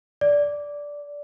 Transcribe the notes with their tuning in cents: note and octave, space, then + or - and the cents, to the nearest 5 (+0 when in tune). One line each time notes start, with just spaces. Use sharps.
D5 -10